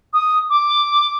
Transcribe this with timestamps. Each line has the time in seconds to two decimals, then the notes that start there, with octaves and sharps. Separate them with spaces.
0.13 D#6
0.50 D6